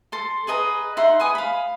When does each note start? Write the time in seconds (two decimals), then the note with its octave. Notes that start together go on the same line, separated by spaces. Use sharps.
0.12 A4 C6
0.47 G#4 B4 D#5 A#5
0.97 D#4 E5 F#5 C6
1.20 B4 G#5 D#6
1.35 F5 B5